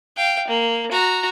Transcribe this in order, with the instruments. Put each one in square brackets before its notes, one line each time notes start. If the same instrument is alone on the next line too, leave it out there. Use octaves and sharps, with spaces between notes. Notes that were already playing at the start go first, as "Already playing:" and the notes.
[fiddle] F5 G5
A#3
F#4 A#5